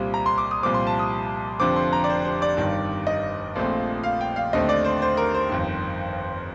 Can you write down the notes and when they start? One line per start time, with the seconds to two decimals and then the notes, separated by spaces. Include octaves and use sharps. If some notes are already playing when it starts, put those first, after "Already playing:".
Already playing: C2 A#2 G3 C4 F4
0.14 A#5
0.26 C6
0.38 D6
0.51 D#6
0.63 C2 A#2 F3 C4 D6
0.74 C6
0.87 A5
0.99 D#6
1.60 F1 F2 D3 F3 C4 D6
1.76 C6
1.93 A#5
2.04 D5
2.10 C5
2.25 C5
2.42 D5
2.57 G1 G2 D#3
3.07 D#5
3.56 A#1 A#2 F3 A3 C4
4.03 F5
4.21 G5
4.36 F5
4.53 D#2 D3 A3 C4 D#5
4.69 D5
4.85 C5
5.02 C5
5.17 A#4
5.34 C5
5.49 G1 F2 D#3